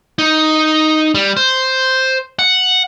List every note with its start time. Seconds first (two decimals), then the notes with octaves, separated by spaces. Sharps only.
0.19 D#4
1.15 G3
1.37 C5
2.39 F#5